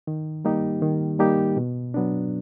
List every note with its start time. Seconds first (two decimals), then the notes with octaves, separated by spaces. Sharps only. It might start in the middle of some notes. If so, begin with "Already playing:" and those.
0.07 D#3
0.45 G3 A#3 D#4 G4
0.82 D#3
1.19 G3 A#3 D#4 G4
1.57 B2
1.94 F#3 B3 D4